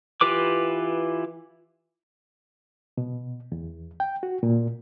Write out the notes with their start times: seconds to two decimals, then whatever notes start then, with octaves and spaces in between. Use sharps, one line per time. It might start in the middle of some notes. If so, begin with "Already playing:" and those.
0.21 E3 F4 G4 B4 D6
2.98 B2
3.52 E2
4.00 G5
4.23 F#4
4.43 A#2